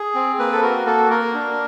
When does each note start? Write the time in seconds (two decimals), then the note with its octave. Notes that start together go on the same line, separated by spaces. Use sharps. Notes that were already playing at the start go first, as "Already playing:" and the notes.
Already playing: G#4
0.15 C4
0.39 A#3 B4
0.52 A4
0.62 F#4 A#4
0.86 A#3 A4
1.10 A#3 A#4
1.34 D4